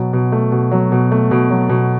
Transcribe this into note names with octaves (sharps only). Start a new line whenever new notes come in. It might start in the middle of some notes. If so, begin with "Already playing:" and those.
Already playing: B2 F#3
B2
A3
B2
F#3
B2
A3
B2
F#3
B2